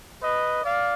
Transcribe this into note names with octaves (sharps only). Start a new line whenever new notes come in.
B4 D#5
D5 F5